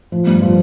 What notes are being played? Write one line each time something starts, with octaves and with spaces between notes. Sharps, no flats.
F3
G2
F3